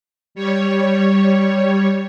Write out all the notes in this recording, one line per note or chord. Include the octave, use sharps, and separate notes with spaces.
G3 C#5